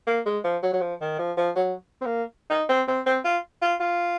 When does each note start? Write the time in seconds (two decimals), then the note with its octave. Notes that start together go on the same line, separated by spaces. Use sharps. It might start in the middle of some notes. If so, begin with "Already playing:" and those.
0.07 A#3
0.26 G#3
0.44 F3
0.63 F#3
0.73 F#3
0.81 F3
1.01 D#3
1.19 F3
1.37 F3
1.56 F#3
2.01 C4
2.06 A#3
2.50 D#4
2.69 C4
2.88 C4
3.06 C4
3.25 F4
3.62 F4
3.80 F4